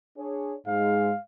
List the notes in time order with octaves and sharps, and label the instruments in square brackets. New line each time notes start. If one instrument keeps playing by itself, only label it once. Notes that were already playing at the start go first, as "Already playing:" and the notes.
[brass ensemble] D4 G#4 C#5
[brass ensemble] G#2 G#3 [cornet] F5